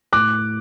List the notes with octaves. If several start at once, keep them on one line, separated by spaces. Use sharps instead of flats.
A2 D6 F#6